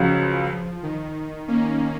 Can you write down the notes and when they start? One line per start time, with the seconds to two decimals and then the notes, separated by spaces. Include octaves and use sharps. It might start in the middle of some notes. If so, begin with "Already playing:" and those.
Already playing: C#2 C#3 F3 F#3
0.83 D#3
1.48 A#3 C#4